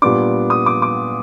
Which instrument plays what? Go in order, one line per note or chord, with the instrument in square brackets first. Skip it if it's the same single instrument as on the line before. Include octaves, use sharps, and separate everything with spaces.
[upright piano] A#2 G3 B3 D4 D6
D#6
D6
D6